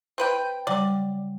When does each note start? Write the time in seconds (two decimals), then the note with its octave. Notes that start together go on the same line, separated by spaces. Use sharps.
0.18 C4 B4 G5
0.67 C#3 F#3 G3 D5